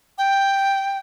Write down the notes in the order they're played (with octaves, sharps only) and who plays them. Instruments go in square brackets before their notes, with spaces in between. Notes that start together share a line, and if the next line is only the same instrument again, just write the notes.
[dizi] G5